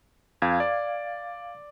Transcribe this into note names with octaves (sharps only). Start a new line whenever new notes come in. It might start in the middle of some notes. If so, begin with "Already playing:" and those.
F2 F5 G#6
D5